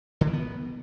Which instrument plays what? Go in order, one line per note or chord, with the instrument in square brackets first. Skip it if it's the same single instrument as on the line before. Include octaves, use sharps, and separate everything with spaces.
[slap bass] D3
E3
B3